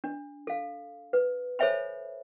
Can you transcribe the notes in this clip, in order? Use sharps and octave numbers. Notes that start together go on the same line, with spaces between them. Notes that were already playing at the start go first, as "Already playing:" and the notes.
D4
A4 F5
B4
A4 C5 C#5 E5 G#5 B5